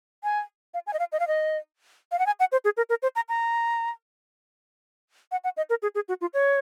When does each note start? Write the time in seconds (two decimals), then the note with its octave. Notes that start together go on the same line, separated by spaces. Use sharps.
0.24 G#5
0.74 F5
0.87 G#5
0.93 D#5
0.99 F5
1.12 D#5
1.20 F5
1.28 D#5
2.12 F5
2.19 F#5
2.26 G#5
2.40 F#5
2.52 C5
2.65 G#4
2.77 A#4
2.90 A#4
3.03 C5
3.16 A#5
3.29 A#5
5.31 F#5
5.44 F#5
5.57 D#5
5.70 A#4
5.82 G#4
5.95 G#4
6.08 F#4
6.21 F4
6.34 C#5